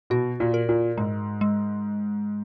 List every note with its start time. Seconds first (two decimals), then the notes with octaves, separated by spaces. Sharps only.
0.10 B2 F#4
0.40 A#2
0.54 A#4
0.69 A#2
0.98 G#2 G#3
1.41 G#3